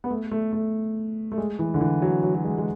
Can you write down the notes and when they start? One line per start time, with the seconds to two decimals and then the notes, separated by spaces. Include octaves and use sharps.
0.04 B3
0.10 A3
0.32 A3
0.53 A3
1.32 A3
1.38 G#3
1.59 E3
1.74 D3
1.81 E3
2.02 F#3
2.23 F#3
2.35 F#3
2.44 G#3
2.58 G#3